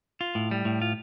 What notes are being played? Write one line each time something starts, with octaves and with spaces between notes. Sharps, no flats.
F4
A2
G3
A2
F4